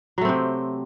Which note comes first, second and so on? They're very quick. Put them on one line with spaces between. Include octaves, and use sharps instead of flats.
F#3 A3 C4 C3